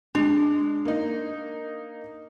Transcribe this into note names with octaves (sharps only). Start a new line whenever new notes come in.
G#3 D4
A#3 D#4